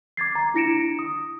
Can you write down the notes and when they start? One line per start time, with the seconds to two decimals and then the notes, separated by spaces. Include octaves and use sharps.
0.17 D6 G#6 A6 C7
0.35 A#5
0.54 D4 E4 A#6 C#7 D7 E7
0.99 D#6